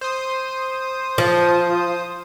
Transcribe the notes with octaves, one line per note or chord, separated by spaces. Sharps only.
C5 D#6
F3